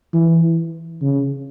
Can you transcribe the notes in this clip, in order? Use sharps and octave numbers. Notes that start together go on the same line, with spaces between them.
E3
C#3